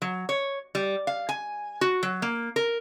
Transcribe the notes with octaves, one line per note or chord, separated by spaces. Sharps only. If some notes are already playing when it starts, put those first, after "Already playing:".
F#3
C#5
G3
F5
G#5
F#4
F#3
A#3
A#4